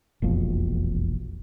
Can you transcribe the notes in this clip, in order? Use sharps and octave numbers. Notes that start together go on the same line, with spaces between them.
E1 A#1 F2